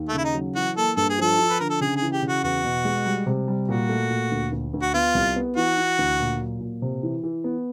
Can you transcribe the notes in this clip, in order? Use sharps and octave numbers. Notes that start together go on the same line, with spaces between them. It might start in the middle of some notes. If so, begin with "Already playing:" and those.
Already playing: D#2
A3
C#3 E4
D#4
F#3
E3 F#4
A#3 A4
G2 A4
G#4
F3 A4
F3
B4
D3 A#4
A4
C#3 G#4
G#4
E3
G4
C#3
F#4
E2 F#4
B2
G#3
G3
C3
G3
A#2 F#4
A3
A#2
D2
D2
D2
F#4
B3 F4
C2
B3
E3 F#4
E3
D2
A#2
F#3
A#2
C3
E3
E3
B3